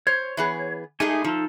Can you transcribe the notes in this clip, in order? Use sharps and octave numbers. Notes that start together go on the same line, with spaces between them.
C5 C#5
E3 B3 G#4
G#3 A3 D#4 G4 G#4 G#5
F3 D#4 A4